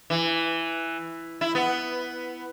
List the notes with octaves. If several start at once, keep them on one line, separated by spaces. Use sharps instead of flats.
E3
E4
B3